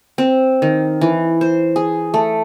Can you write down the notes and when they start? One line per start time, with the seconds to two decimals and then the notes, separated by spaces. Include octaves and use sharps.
0.18 C4
0.62 D#3
1.01 E3
1.41 C5
1.76 G#4
2.14 A3